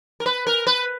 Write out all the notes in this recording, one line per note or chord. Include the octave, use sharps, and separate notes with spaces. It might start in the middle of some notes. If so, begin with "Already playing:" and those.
A#4
B4
A#4
B4